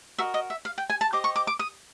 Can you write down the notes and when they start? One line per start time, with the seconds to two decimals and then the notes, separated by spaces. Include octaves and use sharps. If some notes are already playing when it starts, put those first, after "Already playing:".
0.18 F#4 A#4 D#5 E5
0.34 D#5
0.50 E5
0.65 F5
0.78 G5
0.90 G#5
1.01 A5
1.13 G4 C5 D#5 D6
1.24 C#6
1.36 D6
1.47 D6
1.59 D#6